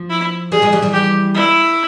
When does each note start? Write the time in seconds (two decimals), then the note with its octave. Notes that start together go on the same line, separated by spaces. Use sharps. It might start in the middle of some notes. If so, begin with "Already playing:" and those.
Already playing: F3
0.10 E4
0.52 E3 G3 G#4
0.62 F3 G#3
0.72 E3 G3
0.82 E3 G3
0.93 G4
1.35 E4